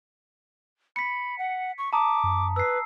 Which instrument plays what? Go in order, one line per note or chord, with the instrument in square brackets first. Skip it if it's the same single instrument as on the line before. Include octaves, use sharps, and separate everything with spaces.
[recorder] B5 [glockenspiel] B6 C#7
[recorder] F#5
C#6
[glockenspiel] A5 A#5 D#6 [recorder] D6
[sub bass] F#2
[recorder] B4 [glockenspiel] E6 C7